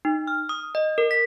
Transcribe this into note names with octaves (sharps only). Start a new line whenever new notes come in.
D#4
F6
D#6
D#5
A#4
B6